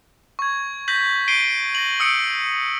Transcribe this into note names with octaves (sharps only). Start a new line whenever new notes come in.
C#6 G#6
G6 A#6 B6 F#7
C7 D7 D#7 G7
A#6 F#7
D#6 E6 C#7 D7